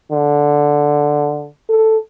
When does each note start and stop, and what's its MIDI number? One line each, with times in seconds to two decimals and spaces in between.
0.12 1.48 50
1.69 1.97 69